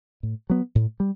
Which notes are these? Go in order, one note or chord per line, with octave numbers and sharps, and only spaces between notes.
A2
F#3 B3
A2
G3